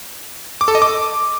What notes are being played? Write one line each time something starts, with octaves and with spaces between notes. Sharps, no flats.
D6
A4
D#5
D6